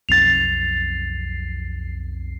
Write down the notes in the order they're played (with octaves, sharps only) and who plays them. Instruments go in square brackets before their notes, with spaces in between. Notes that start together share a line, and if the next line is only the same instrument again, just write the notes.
[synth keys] B1 F2 C7 [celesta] A6 F7